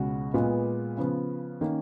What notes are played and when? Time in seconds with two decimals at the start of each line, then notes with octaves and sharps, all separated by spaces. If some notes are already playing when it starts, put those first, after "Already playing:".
Already playing: C#2 B2 G#3 C#4 F#4
0.33 A#2 G#3 B3 F4 B4
0.97 C#3 F3 B3
1.61 D#3 A#3 C#4